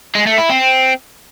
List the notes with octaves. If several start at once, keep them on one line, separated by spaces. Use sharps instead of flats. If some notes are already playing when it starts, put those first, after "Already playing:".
G#3
A3
E4
C4